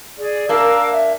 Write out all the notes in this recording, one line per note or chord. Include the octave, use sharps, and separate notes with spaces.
G#4 D5
A#3 D4 A#4 F5 E6
E5